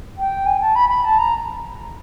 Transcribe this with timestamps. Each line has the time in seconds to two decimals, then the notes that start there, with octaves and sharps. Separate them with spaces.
0.18 G5
0.46 G#5
0.60 A5
0.75 B5
0.89 B5
1.04 A5
1.18 A#5